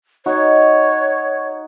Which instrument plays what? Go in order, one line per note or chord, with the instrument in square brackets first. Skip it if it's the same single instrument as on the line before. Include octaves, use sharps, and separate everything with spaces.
[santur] D#4 F#4 [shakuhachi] C#5